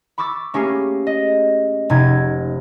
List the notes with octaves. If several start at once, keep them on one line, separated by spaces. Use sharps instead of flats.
B5 C#6 D6 E6 A6
A3 A#3 C#4 G4 G#4 C7
D#5
F1 C3 D#4 G#6